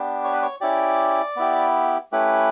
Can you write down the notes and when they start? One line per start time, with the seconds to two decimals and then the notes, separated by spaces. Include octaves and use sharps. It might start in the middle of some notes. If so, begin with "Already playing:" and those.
Already playing: B3 D4 G4
0.24 C#5
0.33 B4
0.42 C#5
0.61 C#4 E4 G4 D5
1.36 B3 E4 G4
2.12 A3 C#4 E4 G4 B4